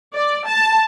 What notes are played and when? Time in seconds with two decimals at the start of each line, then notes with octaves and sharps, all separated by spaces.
0.15 D5
0.46 A5